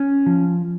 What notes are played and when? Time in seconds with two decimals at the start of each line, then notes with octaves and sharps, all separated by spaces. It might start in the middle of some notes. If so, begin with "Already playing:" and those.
Already playing: C#4
0.26 F3